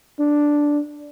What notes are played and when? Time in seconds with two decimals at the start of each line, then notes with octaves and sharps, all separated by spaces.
0.20 D4